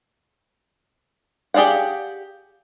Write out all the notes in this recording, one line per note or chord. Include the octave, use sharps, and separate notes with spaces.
G4 G#4 D5 F5 F#5